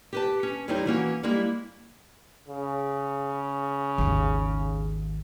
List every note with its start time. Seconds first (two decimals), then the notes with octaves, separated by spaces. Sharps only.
0.13 G4 B4 A5
0.43 C#4
0.68 E2 G3 C4 D#4 E4 C#5
0.86 E3 A#3 C#4 F#4
1.23 G3 G#3 A#3 E4
2.48 C#3
3.98 G#1 D#2